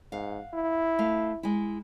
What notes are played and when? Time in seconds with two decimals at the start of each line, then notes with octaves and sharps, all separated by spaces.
0.12 G#2 F5 F#5
0.54 E4
0.99 A3 F5
1.43 G#3 E4